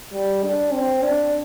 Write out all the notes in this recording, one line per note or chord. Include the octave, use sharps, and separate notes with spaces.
G3
D4
C4
D4